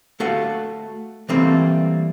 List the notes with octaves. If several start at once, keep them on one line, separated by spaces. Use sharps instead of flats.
A3 F#4 A4 F5 F#5
E3 G3 A3 A#3 C4